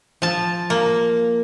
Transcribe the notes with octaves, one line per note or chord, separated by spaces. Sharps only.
F3 A5
A#3